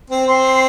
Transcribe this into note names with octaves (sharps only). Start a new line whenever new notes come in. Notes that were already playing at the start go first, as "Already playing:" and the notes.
C4
C4 C6